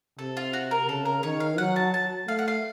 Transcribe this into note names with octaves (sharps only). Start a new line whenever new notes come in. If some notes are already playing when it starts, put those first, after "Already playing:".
C3 A4
F4
F#4
A#4
C#3 A4
A#4
D#3 C#5
F5
F#3 F#5
A5
A5
A3 F5
F#5
F5